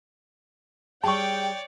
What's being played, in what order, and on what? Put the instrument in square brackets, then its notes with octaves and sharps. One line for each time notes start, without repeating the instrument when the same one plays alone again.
[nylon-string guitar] G3 G#4 [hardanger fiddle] C#5 D5 [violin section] G5 [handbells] A5 C#6